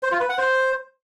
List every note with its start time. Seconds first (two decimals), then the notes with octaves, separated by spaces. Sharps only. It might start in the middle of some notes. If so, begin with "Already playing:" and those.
0.03 C5
0.12 F4
0.20 B4
0.29 F#5
0.38 C5